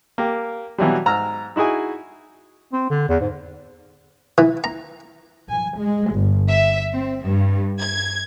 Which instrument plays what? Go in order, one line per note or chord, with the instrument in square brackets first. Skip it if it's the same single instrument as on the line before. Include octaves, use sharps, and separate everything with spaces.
[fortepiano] A#3 G4
B2 E3 F#3 G3
G#2 A#5 E6 F6
D#4 E4 F#4 G#4 G#5
[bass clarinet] C4
D3
E2
G#2
[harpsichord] E3
A#5
[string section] G#5
G#3
G1
E5
C4
G2
G#6